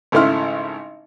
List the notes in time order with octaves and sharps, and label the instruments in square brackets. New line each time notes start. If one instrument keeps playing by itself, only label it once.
[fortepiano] G#1 C#3 A3 E4 C6 F6